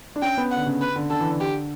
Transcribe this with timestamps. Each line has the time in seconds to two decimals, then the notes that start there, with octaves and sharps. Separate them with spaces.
0.16 D4
0.22 C#4 G5
0.37 B3
0.51 F#5
0.56 D3
0.66 C#3
0.81 B4
0.96 D3
1.10 D3 A4
1.21 E3
1.29 D3
1.40 G4